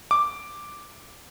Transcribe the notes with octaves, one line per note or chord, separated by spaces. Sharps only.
D6